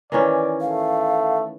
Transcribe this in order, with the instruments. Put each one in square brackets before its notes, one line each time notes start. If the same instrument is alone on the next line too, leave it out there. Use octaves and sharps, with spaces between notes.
[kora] D#3 E3 C#4 [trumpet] D5
[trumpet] A3 [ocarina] F5